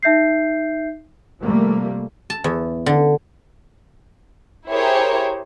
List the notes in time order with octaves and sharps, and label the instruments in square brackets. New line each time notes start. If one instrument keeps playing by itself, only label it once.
[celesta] D#4 E5 G6 C7
[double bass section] C3 F3 G3 A3 A#3
[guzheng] A5
E2
D3
[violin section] E4 G4 G#4 A#4 C5 C#5